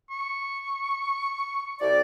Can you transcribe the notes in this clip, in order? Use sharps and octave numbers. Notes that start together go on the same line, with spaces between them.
C#6
C2 D5